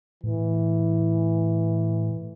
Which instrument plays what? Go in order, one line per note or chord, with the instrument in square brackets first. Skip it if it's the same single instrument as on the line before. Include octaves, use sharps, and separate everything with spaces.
[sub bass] A2 [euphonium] E3